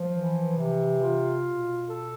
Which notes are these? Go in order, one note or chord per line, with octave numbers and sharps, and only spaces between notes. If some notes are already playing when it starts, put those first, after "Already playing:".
Already playing: F3
E3
C3
F4
B2
A4